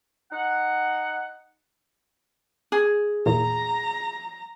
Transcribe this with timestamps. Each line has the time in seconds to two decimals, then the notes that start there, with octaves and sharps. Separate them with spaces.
0.31 D#4 F#5
2.72 G#4
3.26 E2 A#2 A#5